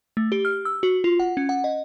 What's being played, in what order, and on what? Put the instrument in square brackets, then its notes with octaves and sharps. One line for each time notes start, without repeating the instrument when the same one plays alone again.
[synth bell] A3
G4
F6
E6
F#4
F4
F#5
C#4
F#5
D#5